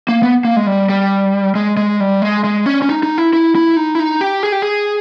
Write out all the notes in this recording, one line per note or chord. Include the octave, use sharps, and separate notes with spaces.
A#3
B3
A#3
G#3
G3
G3
G#3
G#3
G3
G#3
G#3
C#4
C#4
D#4
D#4
E4
E4
E4
D#4
E4
D#4
G4
G#4
G4
G#4